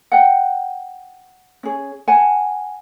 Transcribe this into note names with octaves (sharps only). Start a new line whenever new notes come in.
F#5 G5
C#4 G#4
F#5 G#5 A5